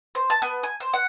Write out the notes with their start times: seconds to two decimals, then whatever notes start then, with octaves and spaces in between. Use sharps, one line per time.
0.15 C5
0.30 A5
0.42 B3
0.63 G#5
0.80 C5
0.94 F#5